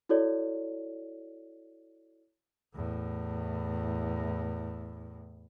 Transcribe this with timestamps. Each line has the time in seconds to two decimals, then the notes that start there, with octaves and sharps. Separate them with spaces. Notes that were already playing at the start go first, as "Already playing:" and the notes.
0.09 E4 F#4 A4 C#5 D5
2.75 E2 A2